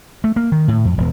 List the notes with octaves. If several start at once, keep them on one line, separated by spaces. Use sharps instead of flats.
A3
A#3
D#3
A2
F2
E1